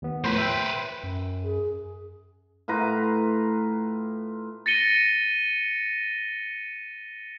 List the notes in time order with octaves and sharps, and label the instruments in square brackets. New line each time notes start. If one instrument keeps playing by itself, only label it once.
[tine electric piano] D#2 B3
[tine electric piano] A2 F3 [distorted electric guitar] B4 C5
[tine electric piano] E5 G5
[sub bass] F#2
[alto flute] G#4
[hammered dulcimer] A2 F4 B4 A#5
[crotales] A6 A#6 C#7 D#7 G7